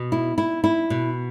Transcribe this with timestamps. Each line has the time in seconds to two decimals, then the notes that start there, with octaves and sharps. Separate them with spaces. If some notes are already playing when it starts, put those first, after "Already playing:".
Already playing: B2
0.12 E4
0.38 E4
0.64 E4
0.90 B2